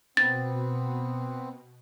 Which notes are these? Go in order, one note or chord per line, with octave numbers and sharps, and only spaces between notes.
B2 B3 C4 A6